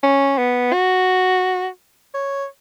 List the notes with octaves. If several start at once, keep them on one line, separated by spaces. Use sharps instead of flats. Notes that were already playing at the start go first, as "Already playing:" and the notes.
C#4
B3
F#4
C#5